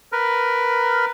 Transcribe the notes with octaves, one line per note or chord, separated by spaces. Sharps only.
A#4 B4